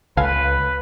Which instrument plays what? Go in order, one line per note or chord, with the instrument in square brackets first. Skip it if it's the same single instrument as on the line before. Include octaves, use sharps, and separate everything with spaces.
[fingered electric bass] C#2 [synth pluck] A4 F5 G#5 [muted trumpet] B4